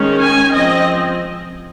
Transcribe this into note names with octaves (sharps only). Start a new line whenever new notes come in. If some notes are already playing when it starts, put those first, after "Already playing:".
Already playing: D#3 G#3 C#4
G#5
F3 C4 D#5